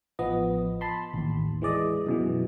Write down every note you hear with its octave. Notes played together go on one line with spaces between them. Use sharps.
A1 F3 B3 D#5
A5 B5 C6
A1 D#2
E3 G#3 D5 D#5
F#2 B2 E3